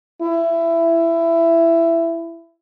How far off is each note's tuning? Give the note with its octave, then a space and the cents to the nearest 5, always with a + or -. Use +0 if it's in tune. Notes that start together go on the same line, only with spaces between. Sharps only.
E4 +15